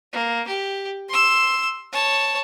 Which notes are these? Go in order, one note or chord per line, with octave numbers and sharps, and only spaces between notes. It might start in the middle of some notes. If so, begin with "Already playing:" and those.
A#3
G4
C6 E6
C#5 A5